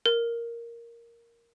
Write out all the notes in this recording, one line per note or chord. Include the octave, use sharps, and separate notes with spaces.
A#4